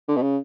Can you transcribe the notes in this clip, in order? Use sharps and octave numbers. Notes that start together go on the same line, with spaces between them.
D3
B2
C#3